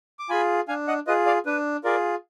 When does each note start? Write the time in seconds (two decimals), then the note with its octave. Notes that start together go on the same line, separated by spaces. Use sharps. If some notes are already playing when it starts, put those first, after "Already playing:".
0.19 D6
0.29 F4 G#4 G#5 B5
0.68 D4 F5 G#5
0.88 D#5 F#5
1.07 F4 G#4 B4 D#5
1.26 D5 F5
1.46 D4 B4
1.84 F4 G#4 A#4 D5